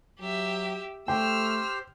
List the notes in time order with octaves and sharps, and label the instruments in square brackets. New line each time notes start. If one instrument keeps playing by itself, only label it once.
[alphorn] F#3 [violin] G4 E5
[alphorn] A3 [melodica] G4 C5 C6 [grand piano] G5 [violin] E6 F6